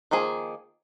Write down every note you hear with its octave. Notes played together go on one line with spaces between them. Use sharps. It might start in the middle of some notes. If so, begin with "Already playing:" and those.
D#3 F3 A#3 G#4